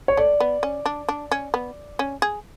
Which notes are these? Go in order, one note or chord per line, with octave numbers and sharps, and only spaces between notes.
C#5
A3 D5
B3
C#4
D4
D4
C#4
B3
C#4
G#4